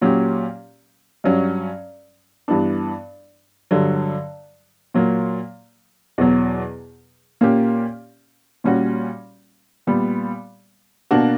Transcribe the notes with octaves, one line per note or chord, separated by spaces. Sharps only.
A#2 F#3 C#4 G4
G2 F#3 C#4
G2 E3 B3 D4
G2 D3 F#3
A#2 F#3 A#3
E2 B2 F#3
A#2 A#3 C#4 G4
A#2 G3 C#4 F#4
A#2 G3 B3
B2 A#3 D4 F#4